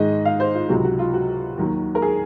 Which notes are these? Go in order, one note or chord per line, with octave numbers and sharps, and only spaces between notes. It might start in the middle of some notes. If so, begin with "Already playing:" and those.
Already playing: G#2 D#3 G#3 D#5
F5
C5
F4
C#2 C3 F#3 F#4
F#4
F4
F#4
D#2 D#3 F#3
A#4
G#4